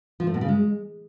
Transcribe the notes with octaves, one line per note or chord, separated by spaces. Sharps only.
F3
A3
B2
C#3
G#3